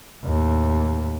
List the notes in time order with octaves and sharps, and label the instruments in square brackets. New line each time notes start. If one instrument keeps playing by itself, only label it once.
[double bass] D#2 A2